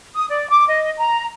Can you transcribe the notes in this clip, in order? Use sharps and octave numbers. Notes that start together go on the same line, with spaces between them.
D#6
D5
D6
D#5
A#5